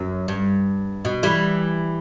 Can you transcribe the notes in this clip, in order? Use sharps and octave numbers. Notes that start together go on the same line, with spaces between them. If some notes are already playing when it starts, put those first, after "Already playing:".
Already playing: F#2
G2
B2
E3 G3